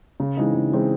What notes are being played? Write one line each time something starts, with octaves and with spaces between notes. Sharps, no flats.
C#3
E3 G#3 C4 D#4
C#3
E3 G#3 C4 D#4